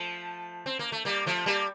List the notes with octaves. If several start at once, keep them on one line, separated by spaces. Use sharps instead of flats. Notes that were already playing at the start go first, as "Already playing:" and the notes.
Already playing: F3 A3
C4
A#3
A3
G3 A#3
F3 A3
G3 A#3